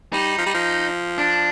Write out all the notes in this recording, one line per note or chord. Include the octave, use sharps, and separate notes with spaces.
G3 D#4
F3
G3
F3
D4